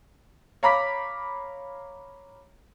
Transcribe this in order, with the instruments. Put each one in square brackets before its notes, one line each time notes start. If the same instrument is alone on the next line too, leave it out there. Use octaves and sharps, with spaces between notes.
[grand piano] C#5 F5 A#5 B5 D6 B6